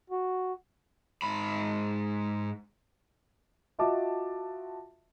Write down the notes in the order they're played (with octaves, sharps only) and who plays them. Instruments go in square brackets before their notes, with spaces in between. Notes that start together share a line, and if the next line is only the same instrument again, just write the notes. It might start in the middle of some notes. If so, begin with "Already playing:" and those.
[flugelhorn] F#4
[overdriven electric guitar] G#2 B5
[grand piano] F4 F#4 D#5 E5 A5 D6